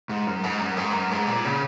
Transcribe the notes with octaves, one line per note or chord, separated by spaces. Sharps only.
G#2
F#2
G#2
F#2
G#2
F#2
G#2
A#2
C#3